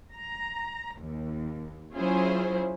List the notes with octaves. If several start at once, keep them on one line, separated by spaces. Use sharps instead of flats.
A#5
D#2
F#3 C#4 E4 F4 G#4 C5